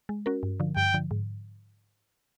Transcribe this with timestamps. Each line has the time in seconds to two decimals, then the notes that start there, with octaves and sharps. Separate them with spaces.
0.09 G#3
0.26 C#4 F#4 A#4
0.43 G2
0.60 D3 F3
0.77 G2 G5
0.94 D3 F3
1.11 G#2